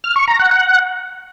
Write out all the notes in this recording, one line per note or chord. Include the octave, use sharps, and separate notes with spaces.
F6
C#6
A#5
F#5
F#5